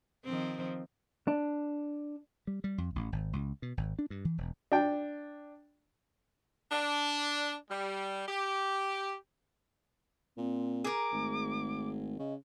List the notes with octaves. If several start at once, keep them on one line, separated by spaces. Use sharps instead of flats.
D#3 F3 C4
D4
G3
G3
F2
A1
G#1
C#2
B2
G#1
D4
G2
E3
E1
D4 G5
D4
G3
G4
A#2 C4
G#4 A#4 D6
G#1 A3
C#3 D#5